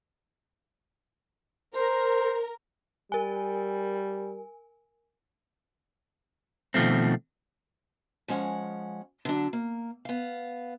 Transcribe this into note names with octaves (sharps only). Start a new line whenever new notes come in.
A#4 C5
G3 A#4 G#5
B2 D#3 F3 A3 C4
F3 G#3 C#4 F#5
D3 F#3 D4
A#3
B3 F5